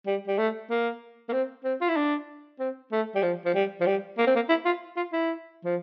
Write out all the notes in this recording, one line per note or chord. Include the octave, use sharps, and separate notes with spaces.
G3
G3
A3
A#3
A#3
C4
C4
F4
E4
D4
C4
A3
G3
F3
F3
G3
F3
G3
A#3
C4
A#3
E4
F4
F4
E4
F3